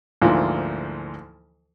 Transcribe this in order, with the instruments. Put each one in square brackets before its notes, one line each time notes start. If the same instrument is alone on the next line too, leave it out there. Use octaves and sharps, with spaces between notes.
[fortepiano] D2 G#2 E3 F3 A#3